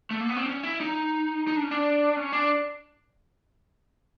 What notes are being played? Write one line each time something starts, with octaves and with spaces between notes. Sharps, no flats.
A3
A#3
B3
C4
C#4
E4
D#4
D#4
D4
C#4
D4
C#4
D4